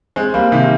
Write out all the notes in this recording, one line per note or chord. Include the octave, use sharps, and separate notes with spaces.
G#3 C4
G3 A#3
C3 D#3